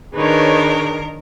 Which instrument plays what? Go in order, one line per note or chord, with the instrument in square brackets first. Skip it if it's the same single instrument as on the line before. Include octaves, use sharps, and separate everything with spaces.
[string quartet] D#3 A#4 [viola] D4 D#4 [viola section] G#4 B4 C#5